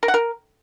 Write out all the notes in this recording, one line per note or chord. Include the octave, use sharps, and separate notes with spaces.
A#4
F#5
A#4